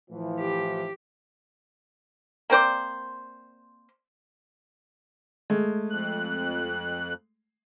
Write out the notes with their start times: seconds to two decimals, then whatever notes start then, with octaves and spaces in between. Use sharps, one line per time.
0.10 A2 E3 F3
0.40 G4
2.50 A#3 C4 C5 D5
5.50 G#3 A3
5.90 F2 F#6